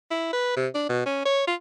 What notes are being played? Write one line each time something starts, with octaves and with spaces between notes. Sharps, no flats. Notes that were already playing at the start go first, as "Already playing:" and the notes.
E4
B4
C3
D4
B2
C#4
C#5
F4